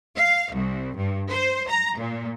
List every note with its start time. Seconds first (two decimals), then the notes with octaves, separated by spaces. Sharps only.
0.15 F5
0.52 C2
0.96 G2
1.30 C5
1.69 A#5
1.99 A#2